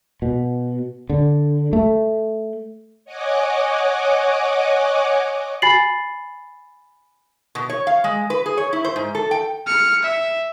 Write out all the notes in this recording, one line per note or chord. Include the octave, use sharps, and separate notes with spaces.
B2
D3
A3
C#5 D#5 F#5 G#5 D6
G#5 B5 A6 C7 F#7
B2
C#5
F5
G#3
B4
G#4
C#5
E4
C5
G#2
A4
G5
F6 C#7
E5